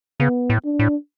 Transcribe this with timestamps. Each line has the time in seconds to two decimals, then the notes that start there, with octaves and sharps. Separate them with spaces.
0.20 C#3 B3
0.50 A2
0.65 D4
0.79 A2